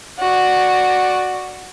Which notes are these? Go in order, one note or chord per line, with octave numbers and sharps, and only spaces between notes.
F#4 D5